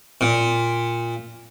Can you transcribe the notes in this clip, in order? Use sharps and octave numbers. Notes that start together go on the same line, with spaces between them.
A#2